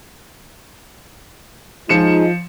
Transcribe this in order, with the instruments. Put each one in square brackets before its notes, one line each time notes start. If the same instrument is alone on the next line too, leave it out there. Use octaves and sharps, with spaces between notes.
[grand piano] F3 C#7 E7 [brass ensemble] G#3 D#4 [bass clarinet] F4